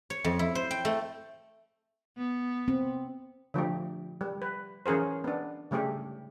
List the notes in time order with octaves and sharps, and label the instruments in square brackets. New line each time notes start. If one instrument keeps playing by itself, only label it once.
[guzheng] C#5
F2
E4
C5
G5
A3
[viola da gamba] B3
[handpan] C4
[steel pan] D3 F3 A3 G4
G3
B4
E3 C#4 G#4 A#4 C5
B3 D4
C#3 G3 A3 G4 G#4